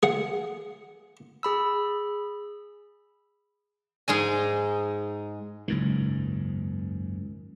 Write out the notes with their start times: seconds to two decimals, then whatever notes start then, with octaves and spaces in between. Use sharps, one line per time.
0.03 G#4 F#5
1.43 G#4 B5 E6
4.08 G#2 G#3 D#4 G#5
5.68 F#1 C#2 G#2 D#3